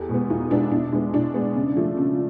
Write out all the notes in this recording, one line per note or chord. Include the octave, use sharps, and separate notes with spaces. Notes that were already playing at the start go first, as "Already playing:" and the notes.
Already playing: E2 G4 A4
B2 G#3 B3
E2 D#4 F4
B2 G#3 B3 D4 E4
B2 D4 E4
G#3 B3 D4 E4
B2 D4 E4
G#3 B3
C#3
F3 A3
C#3